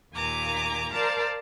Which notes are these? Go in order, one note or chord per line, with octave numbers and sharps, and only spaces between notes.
D#2 A#2 G#5 A#5 D6
A#4 C5 D5 F5 A5 A#5